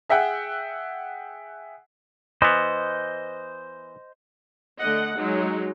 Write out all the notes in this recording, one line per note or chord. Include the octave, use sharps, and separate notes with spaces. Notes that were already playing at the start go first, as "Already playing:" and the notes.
G#4 E5 F#5 G5 E6 F#6
E3 B3 C5 D#5
D3 A3 D#5 F#5
F#3 G#3 D#4